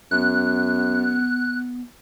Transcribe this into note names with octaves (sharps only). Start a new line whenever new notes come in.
F#2 B3 F#6